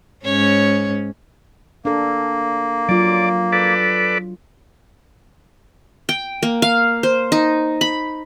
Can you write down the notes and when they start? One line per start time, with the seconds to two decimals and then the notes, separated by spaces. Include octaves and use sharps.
0.25 G#2 C#4 C#5
1.85 A#3 D4 A4
2.89 F#3 F4 D5
3.52 A4 B4 D5
6.09 G5
6.43 A#3
6.62 F5
7.03 C5
7.32 D#4
7.81 B5